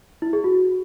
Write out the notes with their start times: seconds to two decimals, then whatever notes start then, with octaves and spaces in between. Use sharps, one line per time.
0.22 E4
0.33 G#4
0.44 F#4